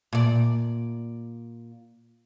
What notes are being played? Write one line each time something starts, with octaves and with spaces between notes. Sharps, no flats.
A#2 D5